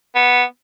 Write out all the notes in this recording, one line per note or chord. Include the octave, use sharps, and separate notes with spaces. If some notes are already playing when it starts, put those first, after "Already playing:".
B3